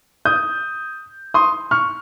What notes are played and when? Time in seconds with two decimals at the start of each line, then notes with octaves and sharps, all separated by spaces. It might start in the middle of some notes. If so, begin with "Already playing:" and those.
0.25 D#6 G6
1.34 C6 D#6
1.71 C#6 F6